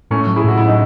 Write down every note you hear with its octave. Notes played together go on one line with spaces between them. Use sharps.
A2 A3 C#4
F#3
E4 G#4
A2 F#4
C#4 E4
D#4